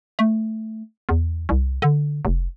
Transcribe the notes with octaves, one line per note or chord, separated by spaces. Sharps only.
A3
E2
C2
D3
F1